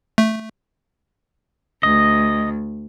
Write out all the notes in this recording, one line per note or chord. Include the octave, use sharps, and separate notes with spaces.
A3
D2 D#5